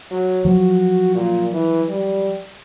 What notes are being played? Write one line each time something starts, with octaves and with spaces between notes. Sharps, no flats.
F#3
F3 F#3 F#4
A#2
E3
G3